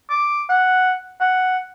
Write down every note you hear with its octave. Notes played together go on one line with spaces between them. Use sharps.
D6
F#5
F#5